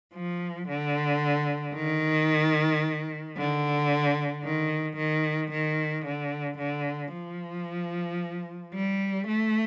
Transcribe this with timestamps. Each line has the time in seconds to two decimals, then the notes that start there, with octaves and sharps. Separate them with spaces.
0.14 F3
0.68 D3
1.75 D#3
3.37 D3
4.44 D#3
4.97 D#3
5.52 D#3
6.05 D3
6.58 D3
7.13 F3
8.74 G3
9.28 A3